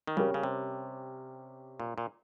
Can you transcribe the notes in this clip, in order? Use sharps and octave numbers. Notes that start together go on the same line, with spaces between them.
D#3
C#3 G3 C#4 G4 A#4
C#3
C3
A#2
A#2